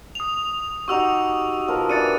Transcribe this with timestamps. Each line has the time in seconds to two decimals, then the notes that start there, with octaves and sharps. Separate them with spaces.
0.15 D#6 F7
0.88 D#4 F#4 G4 C#6 E6 F7
1.68 B2 F3 A#4
1.89 E3 D4 A6 C#7 D#7